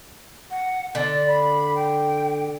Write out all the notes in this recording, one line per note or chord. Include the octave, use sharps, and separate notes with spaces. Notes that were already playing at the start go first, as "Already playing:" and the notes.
F#5
D3 D5
B5
G5